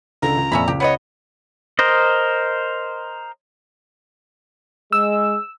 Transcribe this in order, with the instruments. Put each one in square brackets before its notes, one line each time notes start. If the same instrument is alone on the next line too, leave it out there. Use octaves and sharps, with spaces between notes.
[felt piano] C#2 D3 A4 [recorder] A#5
[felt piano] C#2
[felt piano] F2 A#2 [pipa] C#4 E5 B5
[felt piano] C#2 [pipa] G4
[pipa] B3 B4 D#5 [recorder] C#5
[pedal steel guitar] A#4 C5 D#5
[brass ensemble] G#3 [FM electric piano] E6